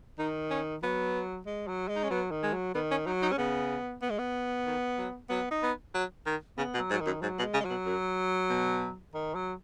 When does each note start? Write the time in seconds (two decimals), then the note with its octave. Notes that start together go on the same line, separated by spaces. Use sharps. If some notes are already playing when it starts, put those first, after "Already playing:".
0.19 D#3 D#4
0.50 C#4
0.82 F#3 B3
1.46 G#3
1.68 F#3
1.89 G#3
1.96 D#4
2.03 C#4
2.10 F#3 B3
2.31 D#3
2.43 G#3
2.53 F#3
2.74 D#3 B3
2.91 C#4
3.06 F#3 D#4
3.22 D#4
3.32 C#4
3.38 C#3 B3
4.02 B3
4.10 G#3
4.19 B3
4.66 D#3
4.98 F#3
5.30 F#3 B3
5.51 D#4
5.63 B3
5.94 F#3
6.26 D#3
6.57 C#3 B3
6.74 B2
6.79 F#3
6.91 G#2
6.93 F#3
7.01 D#3
7.06 F#2
7.22 G#2 F#3
7.39 B2
7.43 G#3
7.54 C#3
7.60 G#3
7.65 F#3
7.70 B2
7.86 F#2
8.49 B2
9.14 D#3
9.35 F#3